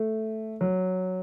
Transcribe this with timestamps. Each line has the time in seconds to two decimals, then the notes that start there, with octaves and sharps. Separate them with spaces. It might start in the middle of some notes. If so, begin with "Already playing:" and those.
Already playing: A3
0.61 F#3